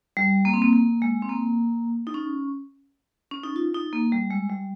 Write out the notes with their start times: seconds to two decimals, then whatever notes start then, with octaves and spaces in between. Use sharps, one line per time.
0.17 G3
0.45 A#3
0.53 C4
0.62 A#3
0.73 A#3
1.02 G#3
1.22 C4
1.29 A#3
2.07 D#4
2.14 C#4
3.31 C#4
3.44 D#4
3.56 F4
3.74 D#4
3.93 A#3
4.12 G3
4.31 G#3
4.50 G3